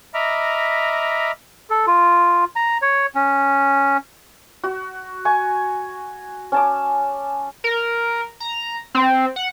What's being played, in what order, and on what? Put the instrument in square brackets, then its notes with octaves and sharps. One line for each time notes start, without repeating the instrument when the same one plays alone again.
[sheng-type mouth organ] D#5 E5 A#5 B5 D6 F6
[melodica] A4
F4
A#5
C#5
C#4
[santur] F#4
G#5 C#6
C#4 A5 D6
[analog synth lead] A#4
A#5
C4
F#5